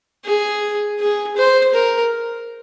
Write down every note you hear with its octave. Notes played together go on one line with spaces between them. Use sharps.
G#4
G#4
C5
A#4